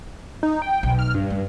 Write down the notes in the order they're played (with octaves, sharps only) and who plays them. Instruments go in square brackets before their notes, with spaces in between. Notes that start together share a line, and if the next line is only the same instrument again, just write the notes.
[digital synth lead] D#4
G5
[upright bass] B1
[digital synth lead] F6
G2
[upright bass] F#2